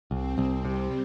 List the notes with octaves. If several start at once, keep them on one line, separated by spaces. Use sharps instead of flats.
C2 C4
C2
C3 G3